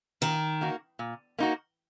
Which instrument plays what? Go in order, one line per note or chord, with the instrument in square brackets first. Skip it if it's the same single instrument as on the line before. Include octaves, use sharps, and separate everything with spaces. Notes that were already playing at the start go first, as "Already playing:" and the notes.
[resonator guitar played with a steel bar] A#2 [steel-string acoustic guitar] D#3
[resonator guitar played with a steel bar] A#3 D#4 F#4
A#2
A#3 D#4 F#4